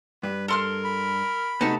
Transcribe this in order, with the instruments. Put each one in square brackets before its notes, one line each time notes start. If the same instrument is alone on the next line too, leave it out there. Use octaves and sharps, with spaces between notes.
[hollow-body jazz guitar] G2 [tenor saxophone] B4
[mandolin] A4 C6 F6 [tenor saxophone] A#4
[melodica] B5
[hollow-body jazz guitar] C3 A3 B3 [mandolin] D#4 A5 [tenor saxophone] F#4